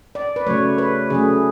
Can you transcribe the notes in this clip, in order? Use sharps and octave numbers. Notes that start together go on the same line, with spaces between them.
D5
B4
C#3 F#3 A3 C#5
B4
C#3 F#3 A3 G#4